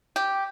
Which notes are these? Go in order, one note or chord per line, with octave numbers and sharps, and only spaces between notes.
G4